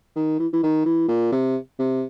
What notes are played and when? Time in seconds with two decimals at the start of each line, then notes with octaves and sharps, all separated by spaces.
0.16 D#3
0.40 E3
0.53 E3
0.63 D#3
0.86 E3
1.08 A#2
1.32 C3
1.79 C3